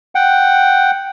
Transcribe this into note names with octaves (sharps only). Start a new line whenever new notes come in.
F#5 G5